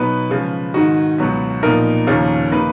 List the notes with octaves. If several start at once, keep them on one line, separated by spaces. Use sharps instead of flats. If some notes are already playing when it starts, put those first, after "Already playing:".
Already playing: B2 F#3 B3 D#4 B4
C#3 F3 G#3
G#2 D#3 G#3 D#4 F#4
C#2 B2 F#3 B3
A#2 F3 B3 D#4 A#4
D#2 C#3 F3 A#3 C#4
D#3 A#3 D#4 B4